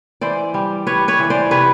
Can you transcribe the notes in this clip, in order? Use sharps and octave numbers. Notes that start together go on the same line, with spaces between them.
E3 C5 D5
G3
G3 B4 C#5
B4 C#5
E3
C5 D5
C3 B4 C#5